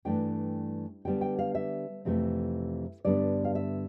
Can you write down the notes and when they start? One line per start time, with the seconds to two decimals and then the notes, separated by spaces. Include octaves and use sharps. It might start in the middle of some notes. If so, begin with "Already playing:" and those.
0.05 G2 E3 A3 D4 G5
1.05 D3 G3 B3 G5
1.21 G5
1.39 F5
1.55 E5
2.05 F2 C3 E3 A3
3.05 G2 D3 G3 B3 D4 D5
3.45 F5
3.55 E5